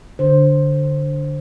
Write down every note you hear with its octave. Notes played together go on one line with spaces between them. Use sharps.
D3 C5